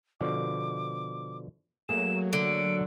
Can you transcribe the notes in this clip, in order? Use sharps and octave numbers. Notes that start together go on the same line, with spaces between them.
B2 D3 F3 D6
F#3 A3 A#3 G#4 E7
D3 D7